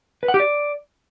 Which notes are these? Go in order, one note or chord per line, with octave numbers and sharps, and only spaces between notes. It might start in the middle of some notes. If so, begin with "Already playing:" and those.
B4
F#5
G4
D5